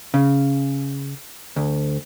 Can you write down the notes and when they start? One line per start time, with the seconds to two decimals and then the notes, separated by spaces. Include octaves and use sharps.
0.14 C#3
1.56 D2